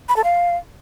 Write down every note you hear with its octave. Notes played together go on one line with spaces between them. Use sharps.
B5
A4
F5